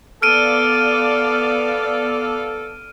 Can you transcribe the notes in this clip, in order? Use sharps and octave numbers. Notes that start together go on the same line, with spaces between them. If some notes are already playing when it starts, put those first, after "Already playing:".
B3 A4 D5 F5 F6 D7 D#7